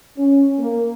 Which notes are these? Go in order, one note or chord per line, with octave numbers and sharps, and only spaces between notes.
C#4
A#3